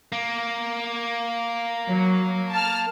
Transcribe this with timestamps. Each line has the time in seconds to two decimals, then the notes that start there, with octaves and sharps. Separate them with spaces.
0.12 A#3
1.87 F#3
2.51 A5 F6